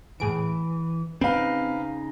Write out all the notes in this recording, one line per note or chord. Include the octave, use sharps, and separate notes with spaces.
A2 E3 G#4 D7
C#3 C4 D#4 B4 F5